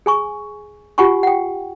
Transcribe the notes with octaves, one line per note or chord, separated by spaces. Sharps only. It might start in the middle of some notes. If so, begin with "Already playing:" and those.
G#4 G#5 C#6
F4 G4 F#5 G#5 C#6
F#5 G5